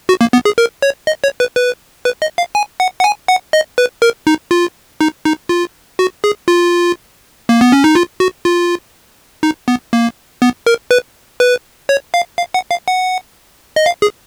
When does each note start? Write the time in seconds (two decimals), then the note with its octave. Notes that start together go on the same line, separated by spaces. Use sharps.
0.09 F#4
0.21 A#3
0.33 B3
0.45 G#4
0.58 A#4
0.82 C#5
1.07 D#5
1.24 C#5
1.40 B4
1.56 B4
2.05 B4
2.22 D#5
2.38 F5
2.55 G#5
2.80 F#5
3.00 F#5
3.04 G#5
3.28 F#5
3.53 D#5
3.78 B4
4.02 A#4
4.27 D#4
4.51 F4
5.01 D#4
5.25 D#4
5.49 F4
5.99 F#4
6.24 G#4
6.48 F4
7.49 A#3
7.61 B3
7.72 C#4
7.84 D#4
7.95 F4
8.20 F#4
8.45 F4
9.43 D#4
9.68 B3
9.93 A#3
10.42 B3
10.67 A#4
10.91 B4
11.40 B4
11.89 C#5
12.14 F5
12.38 F5
12.54 F#5
12.71 F5
12.88 F#5
13.76 D#5
13.86 F5
14.02 G#4